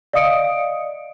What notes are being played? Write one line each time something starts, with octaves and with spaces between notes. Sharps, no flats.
D5 D#5 F5 D#6 C#7 D7